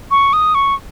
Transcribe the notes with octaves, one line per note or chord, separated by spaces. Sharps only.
C#6
D#6
C#6